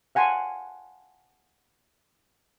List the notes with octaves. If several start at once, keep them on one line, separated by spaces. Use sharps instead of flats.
F5 F#5 G#5 A5 C6